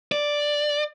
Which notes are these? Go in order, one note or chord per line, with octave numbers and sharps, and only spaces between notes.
D5